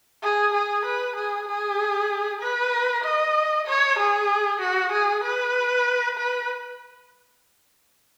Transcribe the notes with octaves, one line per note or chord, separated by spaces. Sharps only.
G#4
G#4
B4
G#4
G#4
B4
D#5
C#5
G#4
F#4
G#4
B4
B4